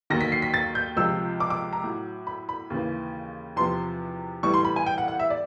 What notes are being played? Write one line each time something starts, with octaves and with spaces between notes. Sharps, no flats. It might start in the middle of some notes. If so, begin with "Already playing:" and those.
D#2 D#3 F#3 A#6
B6
C7
B6
A6
G6
C#2 C3 F3 E6
D6
D6
A#5
A2 F#3
B5
B5
D#2 C#3 E3
E2 C3 F3 C6
A2 E3 G3 C#6
C6
B5
G#5
G5
F#5
F#5
E5
D5